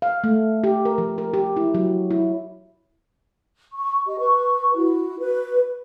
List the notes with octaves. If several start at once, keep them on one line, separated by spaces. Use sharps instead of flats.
F5
A3
G4
A#4
F3
A#4
G4
E4
F#3
E4
C#6
G4 D#5
B4 C#6
E4 F#4
F#4 B4